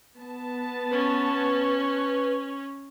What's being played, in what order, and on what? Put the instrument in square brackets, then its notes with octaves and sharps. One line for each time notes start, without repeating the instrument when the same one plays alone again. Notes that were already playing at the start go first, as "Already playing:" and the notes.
[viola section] B3 A5
[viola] C#4 [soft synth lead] B4